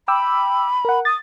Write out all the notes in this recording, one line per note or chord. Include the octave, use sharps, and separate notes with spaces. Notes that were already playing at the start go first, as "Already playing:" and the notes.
G5 B5 D6 E6
A#4 F#5
D#6 A6